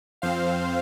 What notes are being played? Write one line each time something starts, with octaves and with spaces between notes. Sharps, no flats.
F2 F3 C4 C5 F5